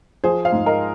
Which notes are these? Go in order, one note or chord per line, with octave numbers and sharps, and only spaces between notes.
F3 G#4 C5
C5 F5
G#2
A#4 D#5